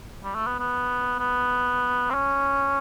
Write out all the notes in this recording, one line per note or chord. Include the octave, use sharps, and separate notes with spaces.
G3
A3
B3
B3
B3
C4
C#4